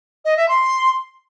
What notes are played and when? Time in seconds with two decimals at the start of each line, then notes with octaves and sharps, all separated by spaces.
0.24 D#5
0.36 E5
0.48 C6